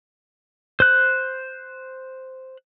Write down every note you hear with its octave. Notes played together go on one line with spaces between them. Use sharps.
C5 F#6